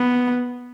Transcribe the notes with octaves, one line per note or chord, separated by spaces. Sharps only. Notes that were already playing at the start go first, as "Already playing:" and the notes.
Already playing: B3